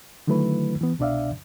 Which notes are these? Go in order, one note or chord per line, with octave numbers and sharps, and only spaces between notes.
D3 D#3 F#3 A3 E4 B4
E3 B3
C2 B2 D4 D5 E5 F5